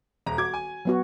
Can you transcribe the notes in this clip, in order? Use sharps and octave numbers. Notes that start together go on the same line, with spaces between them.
D#1 A#5
F#4 D6 G#6
G#5
F#3 B3 F#4